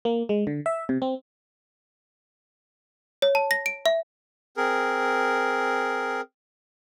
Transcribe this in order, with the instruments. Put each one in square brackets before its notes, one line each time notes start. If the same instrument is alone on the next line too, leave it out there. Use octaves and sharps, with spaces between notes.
[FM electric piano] A#3
G#3
D3
E5
C3
C4
[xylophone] C#5
A5
A#6
D7
E5
[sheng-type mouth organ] C4 G#4 A#4